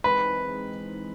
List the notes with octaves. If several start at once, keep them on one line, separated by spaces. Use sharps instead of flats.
E3 G#3 C4 D#4 B4